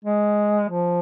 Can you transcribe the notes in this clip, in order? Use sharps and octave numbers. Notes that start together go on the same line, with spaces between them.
G#3
F3